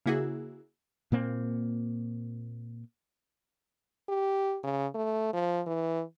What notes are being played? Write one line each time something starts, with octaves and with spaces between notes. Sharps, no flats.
C#3 A#3 E4 F#4 G#4
A#2 A#3 C4
G4
C#3
A3
F3
E3